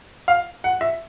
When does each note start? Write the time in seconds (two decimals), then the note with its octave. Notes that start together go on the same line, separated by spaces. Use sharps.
0.28 F5
0.64 F#5
0.81 E5